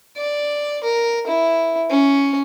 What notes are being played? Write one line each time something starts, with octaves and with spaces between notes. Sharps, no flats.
D5
A#4
E4
C#4